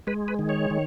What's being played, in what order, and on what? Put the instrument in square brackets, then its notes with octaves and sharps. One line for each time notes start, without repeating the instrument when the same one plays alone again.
[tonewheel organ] G#3 B4
B4
D#3
C#5
D#3